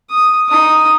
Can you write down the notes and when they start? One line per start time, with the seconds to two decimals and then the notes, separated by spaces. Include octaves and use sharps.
0.10 D#6
0.49 D#4 D#6